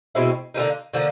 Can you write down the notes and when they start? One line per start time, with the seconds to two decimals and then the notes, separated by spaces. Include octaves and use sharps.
0.15 B2 G#3 C4 E4
0.54 D3 F3 A#3 D#4
0.94 D3 F3 A#3